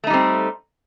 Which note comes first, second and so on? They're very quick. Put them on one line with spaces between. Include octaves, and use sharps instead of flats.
A3 D#4 G3 C4